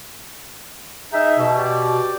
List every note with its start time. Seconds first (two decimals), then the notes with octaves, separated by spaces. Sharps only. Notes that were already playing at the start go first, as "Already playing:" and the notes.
1.13 D#4 G#4 E5
1.38 B2
1.57 G4 D5